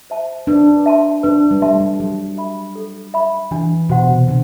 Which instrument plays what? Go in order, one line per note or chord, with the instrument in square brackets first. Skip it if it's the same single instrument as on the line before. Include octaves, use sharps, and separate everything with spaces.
[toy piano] C5 E5 A5
[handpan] D4 [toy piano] B4
[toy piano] E5 A5 C6
[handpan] D4 [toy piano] B4
[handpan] G3
[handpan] A3 [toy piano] E5 A5 C6
[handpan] G3
[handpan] F#3 [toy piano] A4
[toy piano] E5 B5
A4
E5 B5
[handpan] E3 [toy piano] D4
[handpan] B2 [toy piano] F#4 C5 F#5 C6
[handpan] C3
[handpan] D3 [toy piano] D4